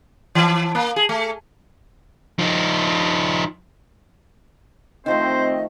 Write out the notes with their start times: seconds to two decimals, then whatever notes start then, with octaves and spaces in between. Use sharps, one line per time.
0.35 E3
0.75 A#3
0.96 G#4
1.09 A3
2.39 F3 D#4
5.06 D#3 F3 A3 C4 C5 D#5